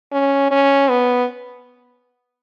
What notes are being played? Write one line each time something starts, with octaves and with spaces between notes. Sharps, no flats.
C#4
C#4
B3